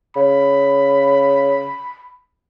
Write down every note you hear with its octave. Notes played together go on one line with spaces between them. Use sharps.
C#3 B5